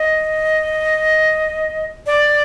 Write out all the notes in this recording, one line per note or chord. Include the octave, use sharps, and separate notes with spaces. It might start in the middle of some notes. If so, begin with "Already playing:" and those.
Already playing: D#5
D5